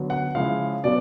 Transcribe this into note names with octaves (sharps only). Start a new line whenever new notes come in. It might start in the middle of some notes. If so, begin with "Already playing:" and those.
Already playing: D3 F#3 B3
F#5
C#3 F3 G#3 C#4 E4 F5
B2 F#3 B3 D5